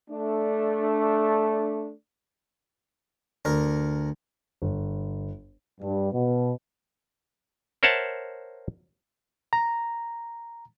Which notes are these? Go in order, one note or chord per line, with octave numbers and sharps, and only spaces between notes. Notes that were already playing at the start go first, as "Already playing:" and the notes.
A3 D4
D2 A#4
G1
G2
B2
A#4 C5 C#5 E5 F#5 A5
A#5